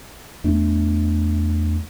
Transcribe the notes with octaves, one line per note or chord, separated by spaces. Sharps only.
E2 A3 D4